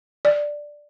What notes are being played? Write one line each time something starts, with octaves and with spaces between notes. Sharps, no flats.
D5